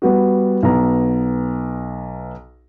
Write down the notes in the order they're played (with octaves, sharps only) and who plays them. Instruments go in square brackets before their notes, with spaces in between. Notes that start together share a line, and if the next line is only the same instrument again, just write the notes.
[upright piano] G3 B3 F#4
B1 B3 A#5